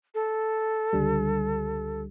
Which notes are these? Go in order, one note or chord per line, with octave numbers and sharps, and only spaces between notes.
A4
C#2 D3 G3